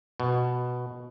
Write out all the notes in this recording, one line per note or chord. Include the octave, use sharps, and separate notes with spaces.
B2